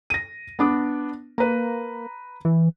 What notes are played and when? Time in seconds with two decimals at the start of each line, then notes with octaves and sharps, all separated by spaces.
0.10 A#6 D#7
0.59 B3 D4 D6
1.38 A#3 B4 A#5
2.45 E3